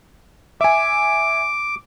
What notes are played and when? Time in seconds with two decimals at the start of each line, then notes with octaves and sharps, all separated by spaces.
0.61 E5 G#5 D6